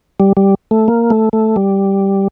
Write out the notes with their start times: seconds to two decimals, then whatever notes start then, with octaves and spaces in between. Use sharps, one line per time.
0.20 G3
0.37 G3
0.71 A3
0.88 A#3
1.10 A3
1.33 A3
1.56 G3